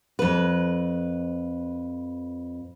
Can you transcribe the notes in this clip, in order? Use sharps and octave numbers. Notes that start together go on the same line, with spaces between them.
F2 B4